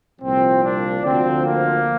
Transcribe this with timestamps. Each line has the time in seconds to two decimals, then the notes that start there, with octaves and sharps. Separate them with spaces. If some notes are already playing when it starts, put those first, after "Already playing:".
0.21 C2 A#2 F3 C4
0.62 D4
1.02 D2 D3 F3 C4
1.43 A#3